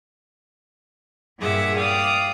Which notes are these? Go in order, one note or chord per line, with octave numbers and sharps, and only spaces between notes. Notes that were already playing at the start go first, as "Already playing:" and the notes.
G2 A#2 G#4 E5 F#5 D6
D5 F5 G5 D#6